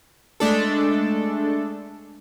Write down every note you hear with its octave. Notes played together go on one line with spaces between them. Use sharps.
G#3 A3 D4 A4